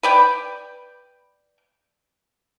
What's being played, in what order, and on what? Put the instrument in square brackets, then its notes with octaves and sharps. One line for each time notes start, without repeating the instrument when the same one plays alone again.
[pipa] B4 D5 G5